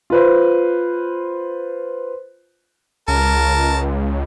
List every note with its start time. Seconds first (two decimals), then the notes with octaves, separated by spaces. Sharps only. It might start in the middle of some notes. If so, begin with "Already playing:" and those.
0.10 F4 B4 C5
3.08 C#2 A#4 A5